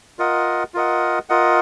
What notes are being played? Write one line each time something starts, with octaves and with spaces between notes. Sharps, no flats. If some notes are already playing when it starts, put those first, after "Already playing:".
F4 A#4 D#5 F#5
F4 A#4 D#5 F#5
F4 A#4 D#5 F#5